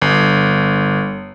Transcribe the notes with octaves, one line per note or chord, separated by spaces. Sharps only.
G1